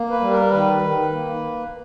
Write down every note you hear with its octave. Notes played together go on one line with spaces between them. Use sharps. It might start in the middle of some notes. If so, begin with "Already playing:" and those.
Already playing: A#3
B4
G3
A#4
D#3 B4
D#3
A#3